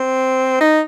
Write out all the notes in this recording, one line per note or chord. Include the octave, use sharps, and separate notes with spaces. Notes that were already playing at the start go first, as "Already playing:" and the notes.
Already playing: C4
D#4